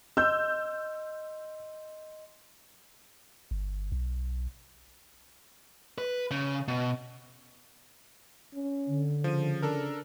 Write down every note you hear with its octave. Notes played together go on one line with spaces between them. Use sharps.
D#5 C6 E6 G6
G1
B1
B4
C#3
B2
C#4
D3
C#3 F3 D#7
D4 A4 A#4